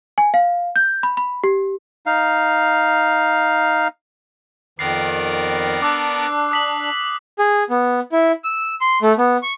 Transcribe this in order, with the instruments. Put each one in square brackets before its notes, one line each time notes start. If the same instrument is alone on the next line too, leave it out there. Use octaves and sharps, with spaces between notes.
[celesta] G#5
F5
G6
B5
B5
G4
[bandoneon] D#4 F5
[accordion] F2 D#3 [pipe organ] B3 A#4 D5 [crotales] C7
[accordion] D4 [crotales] D6 E6 F#6
[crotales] D#6 B6 F#7
[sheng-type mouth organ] G#4
B3
E4
E6
C6
A3
B3
C#6